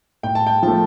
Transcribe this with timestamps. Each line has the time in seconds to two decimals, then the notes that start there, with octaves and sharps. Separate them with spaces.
0.23 A2 G5
0.35 A5
0.47 G5
0.63 F3 A3 A5